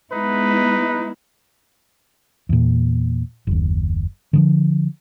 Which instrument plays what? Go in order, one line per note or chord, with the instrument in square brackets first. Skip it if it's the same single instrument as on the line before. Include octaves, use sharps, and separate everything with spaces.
[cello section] G#3 B3 E4 [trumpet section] D#4 B4
[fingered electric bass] E2 A#2
F#1 D#2
D3 E3 F3